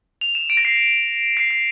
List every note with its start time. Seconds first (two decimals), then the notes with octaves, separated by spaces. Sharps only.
0.21 F7
0.35 E7
0.50 D7
0.57 A#6
0.65 C7
1.37 C7
1.51 C7